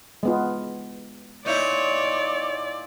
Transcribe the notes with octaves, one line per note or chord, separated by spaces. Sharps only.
G#3 B3 F4
A#2 D#4 E4 C#5 D5